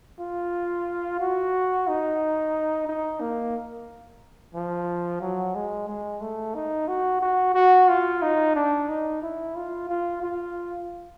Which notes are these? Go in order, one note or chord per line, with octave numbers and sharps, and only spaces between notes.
F4
F#4
D#4
D#4
A#3
F3
F#3
G#3
G#3
A3
D#4
F#4
F#4
F#4
F4
D#4
D4
D#4
E4
F4
F4
F4